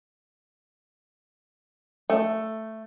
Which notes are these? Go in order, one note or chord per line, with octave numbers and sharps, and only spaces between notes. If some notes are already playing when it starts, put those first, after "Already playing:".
A3